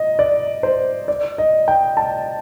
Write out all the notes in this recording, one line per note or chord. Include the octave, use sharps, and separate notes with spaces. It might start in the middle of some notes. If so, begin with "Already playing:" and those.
Already playing: D#5
D5
C5
D5
D#5
G5
A5